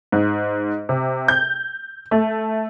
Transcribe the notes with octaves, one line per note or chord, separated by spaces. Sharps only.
G#2
C3
G6
A3